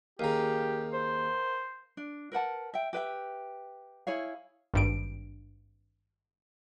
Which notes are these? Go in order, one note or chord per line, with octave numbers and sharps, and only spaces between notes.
D#2 C#3 G4 A#4 F5 A#5
C5
D4
A#4 B4 F#5 A5
E5 G5
G4 B4 E5 G5
E4 G#4 C#5 F5
G#1 G2 D7